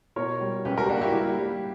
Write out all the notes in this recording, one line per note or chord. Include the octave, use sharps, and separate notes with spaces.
B2 A#4 C#5
G3
C#2 G4 B4
F#4 A#4
G4
A#3 D4 F#4
E4 G4
G3 E4 G4
G3